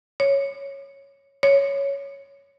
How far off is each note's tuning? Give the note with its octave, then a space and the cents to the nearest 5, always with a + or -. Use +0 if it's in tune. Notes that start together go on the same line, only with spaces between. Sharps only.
C#5 +0
C#5 +5